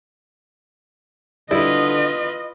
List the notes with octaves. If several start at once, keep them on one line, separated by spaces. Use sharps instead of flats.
D3 G3 E4 F4 B4 D5 D#5